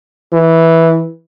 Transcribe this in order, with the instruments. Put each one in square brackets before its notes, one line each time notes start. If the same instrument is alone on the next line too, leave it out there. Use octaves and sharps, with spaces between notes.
[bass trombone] E3